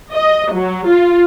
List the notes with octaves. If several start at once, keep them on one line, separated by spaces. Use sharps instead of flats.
D#5
F#3
F4